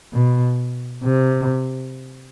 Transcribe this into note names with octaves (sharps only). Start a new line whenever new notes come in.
B2
C3